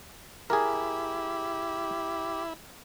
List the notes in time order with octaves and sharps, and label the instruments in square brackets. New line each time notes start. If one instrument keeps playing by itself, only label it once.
[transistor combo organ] E4 [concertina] G4 [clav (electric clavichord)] G#4 A#4